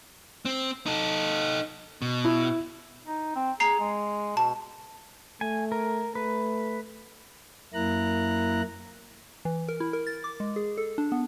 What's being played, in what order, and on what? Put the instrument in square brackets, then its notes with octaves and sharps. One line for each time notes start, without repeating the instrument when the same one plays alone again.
[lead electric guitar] C4
D#4 A4
B2
[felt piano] E4
[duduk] D#4
C4
[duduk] G#4 [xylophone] A#5 C7
[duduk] G#3
[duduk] B2 [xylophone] A5
[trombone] A3 [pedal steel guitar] G#5
[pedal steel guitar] A#4
[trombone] A3 [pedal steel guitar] B4
[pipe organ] F#2 A#3 E4 A#5 F#6
[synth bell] E3
A#4
E4
A#4
A6
D6
G#3
G#4
A4
D4
B3